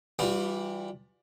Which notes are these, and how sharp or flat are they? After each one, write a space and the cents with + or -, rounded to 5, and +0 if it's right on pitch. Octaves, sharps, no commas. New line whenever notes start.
E3 +0 G3 +0 F4 +40